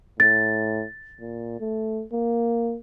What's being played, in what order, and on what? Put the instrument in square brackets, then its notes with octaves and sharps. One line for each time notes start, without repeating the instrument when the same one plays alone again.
[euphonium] A2 [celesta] A6
[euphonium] A#2
A3
A#3